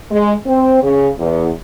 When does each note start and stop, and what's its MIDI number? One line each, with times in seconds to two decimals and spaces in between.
0.11 0.33 56
0.46 0.81 60
0.82 1.08 49
1.19 1.49 40